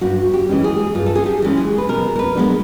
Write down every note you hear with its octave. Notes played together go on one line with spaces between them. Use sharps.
G2 F#4
G4
E3 G#3 C#4
G#4
G2 F4
A4
G#4
G4
E3 G#3 C#4
G#4
B4
B2 A#4
A#4
B4
G#3 B3 D4